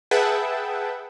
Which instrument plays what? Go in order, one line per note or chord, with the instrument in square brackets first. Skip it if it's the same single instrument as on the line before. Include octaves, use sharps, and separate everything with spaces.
[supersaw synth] G#4 B4 E5 F#5 G5 A5